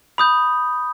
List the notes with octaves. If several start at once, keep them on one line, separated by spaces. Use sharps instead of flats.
B5 D#6 G6